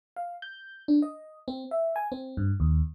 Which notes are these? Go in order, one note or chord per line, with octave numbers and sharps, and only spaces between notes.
F5
G6
D4
D#5
C4
E5
G#5
C4
G2
D#2